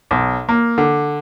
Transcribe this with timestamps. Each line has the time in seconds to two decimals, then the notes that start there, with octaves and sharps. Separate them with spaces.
0.11 B1
0.49 A#3
0.78 D3